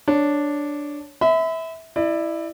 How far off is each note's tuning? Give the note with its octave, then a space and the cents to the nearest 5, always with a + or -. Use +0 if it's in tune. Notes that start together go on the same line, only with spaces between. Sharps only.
D4 +0 C#5 +5
E5 -20 B5 +35
E4 +0 D5 +35